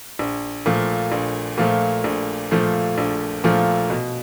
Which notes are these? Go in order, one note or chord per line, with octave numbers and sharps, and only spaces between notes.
A#1
A#2 F3 A3
A#1
A#2 F3 A3
A#1
A#2 F3 A3
A#1
A#2 F3 A3
B2